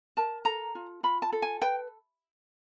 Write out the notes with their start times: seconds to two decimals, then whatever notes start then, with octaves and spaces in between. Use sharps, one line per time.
0.17 A#4 A5
0.45 A4 A#5
0.75 F4
1.03 F4 B5
1.22 A5
1.32 A4
1.42 G#5
1.62 B4 G5